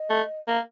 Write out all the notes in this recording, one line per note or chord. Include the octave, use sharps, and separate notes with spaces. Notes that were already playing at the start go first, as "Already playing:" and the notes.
Already playing: D#5
A3
A#3